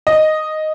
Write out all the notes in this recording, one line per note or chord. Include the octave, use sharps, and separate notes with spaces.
D#5